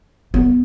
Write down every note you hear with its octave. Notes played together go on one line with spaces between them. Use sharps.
B3